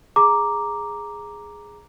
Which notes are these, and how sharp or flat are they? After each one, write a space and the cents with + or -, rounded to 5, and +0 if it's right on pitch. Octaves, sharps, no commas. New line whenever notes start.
G#4 +0 A#5 +0 D6 +0